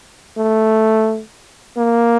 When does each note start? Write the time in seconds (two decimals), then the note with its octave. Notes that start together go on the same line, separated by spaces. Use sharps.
0.37 A3
1.77 A#3